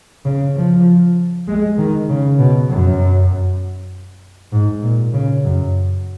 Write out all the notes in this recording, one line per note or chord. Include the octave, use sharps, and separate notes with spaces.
C#3
F3
G#3
D#3
C#3
B2
F#2
G#2
A#2
C#3
F#2